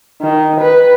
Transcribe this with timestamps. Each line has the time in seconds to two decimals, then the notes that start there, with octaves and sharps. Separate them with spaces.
0.22 D#3
0.60 B4